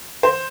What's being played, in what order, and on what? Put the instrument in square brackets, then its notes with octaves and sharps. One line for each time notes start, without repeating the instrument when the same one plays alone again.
[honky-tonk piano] C5